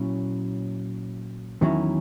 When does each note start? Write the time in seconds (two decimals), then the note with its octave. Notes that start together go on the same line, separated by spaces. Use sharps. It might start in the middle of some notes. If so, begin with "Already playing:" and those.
Already playing: A#2 F#3 C#4 E4
1.61 E2 D#3 F#3 C#4 E4